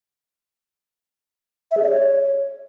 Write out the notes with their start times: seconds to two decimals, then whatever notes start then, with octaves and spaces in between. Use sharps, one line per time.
1.71 E5
1.77 G#4
1.83 D5
1.89 C#5